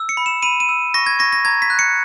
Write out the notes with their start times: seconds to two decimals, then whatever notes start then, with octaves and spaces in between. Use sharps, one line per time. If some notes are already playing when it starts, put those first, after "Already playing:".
Already playing: E6
0.09 C#7
0.17 B5
0.26 E7
0.43 B5 D#7
0.60 D#7
0.69 E6
0.94 C#6 A#6
1.06 G#6
1.19 C#6 A#6
1.33 A#6
1.45 A#5 G#6
1.62 B6
1.70 F#6
1.79 C#7